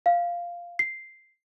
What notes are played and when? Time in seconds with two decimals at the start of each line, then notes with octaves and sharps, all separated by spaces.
0.06 F5
0.79 C7